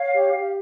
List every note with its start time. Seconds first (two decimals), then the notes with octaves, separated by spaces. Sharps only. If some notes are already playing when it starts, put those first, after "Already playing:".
Already playing: C#5 F5
0.13 G4
0.34 G4